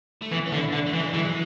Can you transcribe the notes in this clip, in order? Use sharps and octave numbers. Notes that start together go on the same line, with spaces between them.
A3
E3 B3
C#4
D3 D4
E4
D3 D4
A3
E3
G#3
E3 F#3
G#3